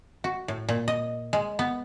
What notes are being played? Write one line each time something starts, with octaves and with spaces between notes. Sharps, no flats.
F#4
A2
A#2
D#5
G#3
B3